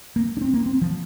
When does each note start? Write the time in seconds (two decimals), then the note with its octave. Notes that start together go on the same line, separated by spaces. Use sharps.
0.16 A#3
0.37 D4
0.41 C4
0.54 A#3
0.66 C4
0.82 F3